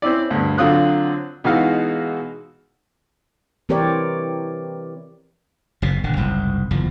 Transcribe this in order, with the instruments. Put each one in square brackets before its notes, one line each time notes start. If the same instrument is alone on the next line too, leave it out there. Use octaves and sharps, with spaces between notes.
[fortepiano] C4 C#4 E4 D5
D2 G2
D3 F#3 C4 F4 D#6 F#6
B2 E3 G#3 D#4 F#4 F5
[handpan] E3 C4 G4 A#4 C#5 D5
[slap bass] F#1 B2
D#1 D3
F#1 C2 G#2
F#1 E2 F3